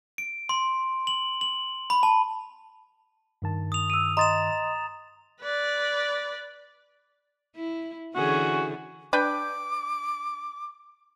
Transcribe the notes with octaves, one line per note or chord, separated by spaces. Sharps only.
D7
C6
F#7
F#7
B5
A5
G2 D#3 A5
D#6 F7
E6 D#7
D#5 A#5 C6 D#6 A6 E7
B4 D5
E4
D3 E3 C#4 F#4 G#4
D4 B4 G5 D6